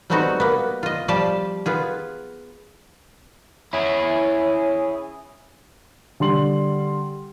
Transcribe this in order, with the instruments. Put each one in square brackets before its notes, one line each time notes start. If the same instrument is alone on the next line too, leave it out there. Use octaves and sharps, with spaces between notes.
[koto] G3 A3 B3 C4 D#4 F#4
A#3 B3
F4 D#5
F3 G3 G4 D5 F5 A5
B3 F4 G#4
[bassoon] C#4 [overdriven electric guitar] E4 G#4
[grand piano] D3 G3 C6 F#7